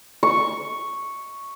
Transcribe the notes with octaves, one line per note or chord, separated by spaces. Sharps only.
C#6